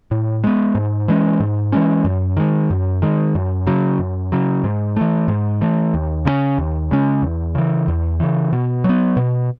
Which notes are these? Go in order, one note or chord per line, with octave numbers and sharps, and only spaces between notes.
A2
G#3 B3
G#2
E3 G#3 C#4
G#2
E3 G#3 C#4
F#2
D#3 G#3
F#2
D#3 G#3
F#2
C#3 F#3
F#2
C#3 F#3
G#2
E3 A3
G#2
E3 A3
D#2
C#3 G#3 C#4
D#2
C#3 G#3 C#4
E2
C#3 E3
E2
C#3 E3
B2
F#3 B3
B2